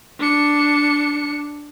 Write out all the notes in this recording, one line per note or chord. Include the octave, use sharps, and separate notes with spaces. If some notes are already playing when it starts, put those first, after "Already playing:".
D4 C#7